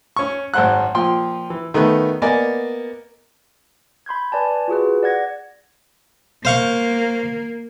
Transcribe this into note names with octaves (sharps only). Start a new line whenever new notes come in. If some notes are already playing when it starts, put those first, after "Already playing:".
C#4 C#6
G#1 F#2 C5 F#5 F#6
A#2 F3 G5 C6
E3
D#3 A3 B3 B4
A#3 B3 D5 D#5 G#5
B5 C6 G6 G#6
B4 D5 G#5 A5
F4 F#4 G#4 B4
D5 F#5 G#6 A#6
A#3 C5 F5 C#6